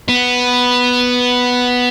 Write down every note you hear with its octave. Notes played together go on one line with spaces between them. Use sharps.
B3